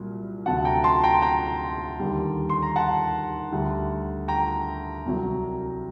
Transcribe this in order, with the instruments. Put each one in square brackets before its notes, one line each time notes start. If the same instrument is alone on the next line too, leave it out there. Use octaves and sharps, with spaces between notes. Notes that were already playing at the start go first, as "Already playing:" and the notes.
Already playing: [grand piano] C2 A#2 F#3
D2 C3 F#3 F#5 A5
G5 A#5
A5 C6
G5 A#5
G5 A#5
D#2 D3 G3
C6
A#5
F#5 A5
D2 D3 G3
G5 A#5
C2 C3 F#3